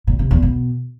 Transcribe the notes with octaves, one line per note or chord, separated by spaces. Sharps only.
A#2
C3
E2
B2